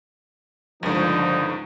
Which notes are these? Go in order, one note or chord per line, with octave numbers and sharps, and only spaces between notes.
C#2 G2 D3 D#3 F3 D#4